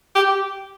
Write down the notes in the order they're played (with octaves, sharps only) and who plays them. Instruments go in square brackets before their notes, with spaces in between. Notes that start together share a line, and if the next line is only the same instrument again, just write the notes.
[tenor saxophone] G4